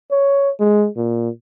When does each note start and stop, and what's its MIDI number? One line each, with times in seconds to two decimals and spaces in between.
0.11 0.50 73
0.60 0.88 56
0.97 1.29 46